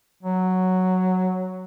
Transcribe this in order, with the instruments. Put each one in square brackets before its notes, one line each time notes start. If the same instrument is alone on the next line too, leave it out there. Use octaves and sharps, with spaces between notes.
[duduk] F#3